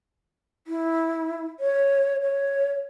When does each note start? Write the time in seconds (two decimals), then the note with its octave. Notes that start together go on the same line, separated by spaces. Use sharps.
0.67 E4
1.60 C#5
2.21 C#5